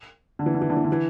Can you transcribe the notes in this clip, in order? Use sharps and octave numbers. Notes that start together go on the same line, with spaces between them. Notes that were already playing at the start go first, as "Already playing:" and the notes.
D3
E3
D3
E3
D3
E3
D3
E3